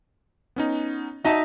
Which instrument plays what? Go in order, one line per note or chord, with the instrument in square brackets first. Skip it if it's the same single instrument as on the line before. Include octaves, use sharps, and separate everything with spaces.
[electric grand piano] B3 C#4 D#4
[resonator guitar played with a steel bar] D#4 E5 [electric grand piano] F#4 A5